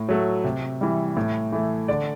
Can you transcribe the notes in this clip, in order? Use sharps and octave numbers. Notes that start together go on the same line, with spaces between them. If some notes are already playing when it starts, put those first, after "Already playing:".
Already playing: A2
F#3 A3
C3
E3 G3
A2
E3 A3
D3 D5